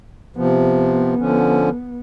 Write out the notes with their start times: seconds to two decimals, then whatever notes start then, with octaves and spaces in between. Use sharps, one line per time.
0.36 C3 F3 B3
1.19 D3 F3 C#4